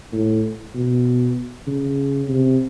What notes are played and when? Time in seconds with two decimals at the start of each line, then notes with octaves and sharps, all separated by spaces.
0.13 A2
0.75 B2
1.67 C#3
2.29 C3